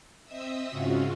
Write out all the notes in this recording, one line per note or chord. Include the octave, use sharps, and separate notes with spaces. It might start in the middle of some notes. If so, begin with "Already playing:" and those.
C4 D#5 E5 D#6 E6
G#2 C#3 C#4 F4 F#4